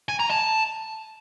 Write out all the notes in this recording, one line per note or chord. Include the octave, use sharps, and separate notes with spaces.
G#5
A#5
A5